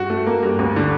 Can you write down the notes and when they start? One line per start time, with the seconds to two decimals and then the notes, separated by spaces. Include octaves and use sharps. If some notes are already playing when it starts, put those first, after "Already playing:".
Already playing: G2 F#4
0.10 A3
0.26 A#3
0.43 G2
0.59 D2
0.76 D3